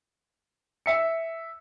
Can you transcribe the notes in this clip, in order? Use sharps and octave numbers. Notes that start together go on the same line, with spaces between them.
E5 C#7